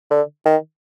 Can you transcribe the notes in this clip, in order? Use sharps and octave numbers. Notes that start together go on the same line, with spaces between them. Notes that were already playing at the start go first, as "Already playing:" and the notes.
D3
D#3